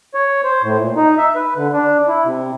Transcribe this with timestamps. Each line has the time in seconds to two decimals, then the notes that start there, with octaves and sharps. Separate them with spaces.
0.14 C#5
0.44 C5
0.63 A2
0.79 A#2
0.96 D#4
1.18 E5
1.36 B4
1.56 D3
1.73 D4
2.08 E4
2.25 C3